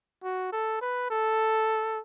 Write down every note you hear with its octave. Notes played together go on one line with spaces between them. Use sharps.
F#4
A4
B4
A4